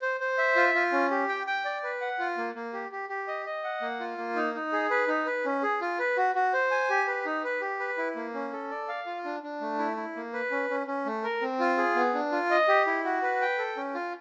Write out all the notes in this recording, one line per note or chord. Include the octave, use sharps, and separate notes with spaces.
C5
C5
E5
F4
F4
C#4
G4
G5
G5
D5
B4
F#5
F4
A#3
A#3
G4
G4
G4
D#5
D#5
F#5
A#3
F4
A#3
D#4
D#4
G#4
B4
D#4
B4
C#4
G#4
F4
B4
F#4
F#4
C5
G#5
G4
B4
D#4
B4
G4
B4
E4
A#3
C#4
A4
D5
F5
F4
D4
D4
A3
E4
E4
A#3
B4
C#4
C#4
C#4
A3
A#4
C4
F4
G#4
B3
D4
F4
D#5
G4
E4
F#4
B4
G5
A4
C#4
F4